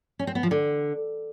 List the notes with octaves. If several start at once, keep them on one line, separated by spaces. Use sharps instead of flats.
C#4
C4
B3
F3
D3